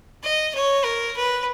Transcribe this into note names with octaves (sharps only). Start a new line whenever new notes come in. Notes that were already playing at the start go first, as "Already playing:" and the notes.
D#5
C#5
A#4
B4